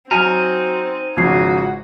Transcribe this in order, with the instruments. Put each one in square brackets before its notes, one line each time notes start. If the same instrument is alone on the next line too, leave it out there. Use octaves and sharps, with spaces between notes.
[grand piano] F#3 [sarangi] C4 [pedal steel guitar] D#4 G#5 A#5 [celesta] F6
[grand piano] G#1 C#3 F3 [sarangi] F#4 [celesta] G#6 C7